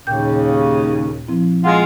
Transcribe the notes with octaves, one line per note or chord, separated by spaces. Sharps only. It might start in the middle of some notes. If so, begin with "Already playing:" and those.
D#2 A#2 C#3 G5 G6
F3 C4 E4
G#3 F4 F#5